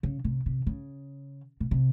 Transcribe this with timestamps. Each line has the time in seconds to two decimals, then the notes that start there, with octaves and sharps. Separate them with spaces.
0.03 C#3
0.24 C3
0.46 C3
0.67 C#3
1.60 B2
1.71 C3